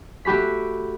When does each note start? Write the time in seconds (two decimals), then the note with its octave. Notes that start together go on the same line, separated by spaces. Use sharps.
0.25 A3 F#4 G4 B5 B6